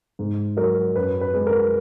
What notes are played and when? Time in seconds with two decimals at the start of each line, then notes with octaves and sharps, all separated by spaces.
0.19 G#2
0.57 F#3 A#4
0.96 F#2 B4
1.21 B4
1.34 G#3
1.47 A#4